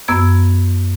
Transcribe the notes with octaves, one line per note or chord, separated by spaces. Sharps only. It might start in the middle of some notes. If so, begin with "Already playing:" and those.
F#2 B3 E6 G#6